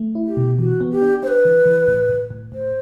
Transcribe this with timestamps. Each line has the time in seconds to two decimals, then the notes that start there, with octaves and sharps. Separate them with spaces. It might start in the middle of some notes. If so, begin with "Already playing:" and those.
Already playing: A3
0.15 E4
0.26 G4
0.37 B2
0.59 E3 F#4
0.81 B3
0.91 G4
1.02 D4
1.23 D4 B4 C5
1.45 E3
1.66 E3
1.88 A2
2.09 A2
2.30 A2
2.52 A2 C5